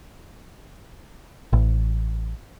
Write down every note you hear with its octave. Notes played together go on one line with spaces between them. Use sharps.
A1